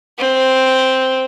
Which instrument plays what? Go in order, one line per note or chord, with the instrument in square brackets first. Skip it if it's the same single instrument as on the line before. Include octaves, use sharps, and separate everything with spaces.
[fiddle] C4